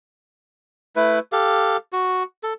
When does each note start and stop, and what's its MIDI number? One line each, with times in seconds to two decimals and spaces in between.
0.96 1.19 57
0.96 1.19 64
0.96 1.19 71
1.32 1.77 67
1.32 1.77 69
1.32 1.77 77
1.93 2.23 66
2.43 2.53 69